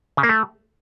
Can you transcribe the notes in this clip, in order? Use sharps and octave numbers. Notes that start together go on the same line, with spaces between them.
C#3
A#3
A3